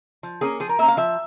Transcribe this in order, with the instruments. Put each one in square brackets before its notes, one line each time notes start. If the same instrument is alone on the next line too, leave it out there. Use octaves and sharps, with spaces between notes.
[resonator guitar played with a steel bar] F3
A#3 C#4 G#4
F3 G#4
A#4
A#3 C#4 E5
F5
F3 E5